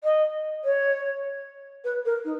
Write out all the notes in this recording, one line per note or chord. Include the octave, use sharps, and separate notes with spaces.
D#5
C#5
B4
A#4
D#4